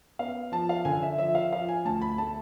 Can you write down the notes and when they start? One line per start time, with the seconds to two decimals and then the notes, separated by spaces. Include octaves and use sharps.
0.19 B3 F5
0.52 F3 A5
0.69 F5
0.85 D3 G#5
1.02 E5
1.18 F3 E5
1.35 F5
1.52 F3 F5
1.68 G#5
1.85 D2 A5
2.02 B5
2.18 A3 A5